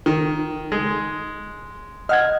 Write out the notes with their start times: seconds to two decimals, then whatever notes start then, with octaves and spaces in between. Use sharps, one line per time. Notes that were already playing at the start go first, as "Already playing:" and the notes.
0.06 D#3
0.72 G#3
2.09 D#5 F#5 F6 G#6